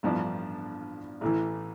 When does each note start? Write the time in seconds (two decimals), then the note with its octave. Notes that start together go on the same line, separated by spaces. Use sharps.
0.03 A1 G2 F3 B3 D4
1.21 A1 A2 E3